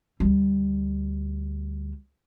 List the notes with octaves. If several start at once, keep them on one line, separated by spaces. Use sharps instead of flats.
D2 G3